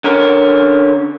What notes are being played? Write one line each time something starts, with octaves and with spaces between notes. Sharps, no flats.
D3 C#4 A#4